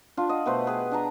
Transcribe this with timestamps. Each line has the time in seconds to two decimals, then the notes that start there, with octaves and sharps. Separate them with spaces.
0.17 D4 F4
0.29 D#5 F#5
0.46 B2 A3 B4 C5
0.67 G4 G#4 B4
0.92 D4 A5 A#5